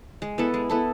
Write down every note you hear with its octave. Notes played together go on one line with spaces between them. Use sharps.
G#3
B3 E4 A4
G#3
B3 E4 A4